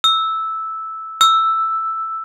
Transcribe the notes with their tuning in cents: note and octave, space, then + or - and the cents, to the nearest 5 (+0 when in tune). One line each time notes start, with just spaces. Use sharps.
E6 -10
E6 +0